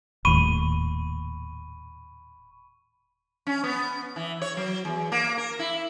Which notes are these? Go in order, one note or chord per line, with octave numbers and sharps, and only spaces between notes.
D#1 D#2 A2 B5 C#6 D#7
C#4
B3
E3
C#5
F#3
E2
A#3
A#4
E4